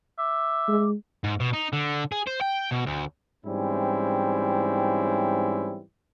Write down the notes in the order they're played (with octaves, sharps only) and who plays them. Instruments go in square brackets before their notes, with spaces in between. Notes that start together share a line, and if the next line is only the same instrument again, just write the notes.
[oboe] E5 [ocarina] D6
[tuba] G#3
[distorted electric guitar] G#2
B2
D#4
D3
G#4
C5
G5
B2
D2
[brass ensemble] G#2 E3 G3 C4 C#4 E4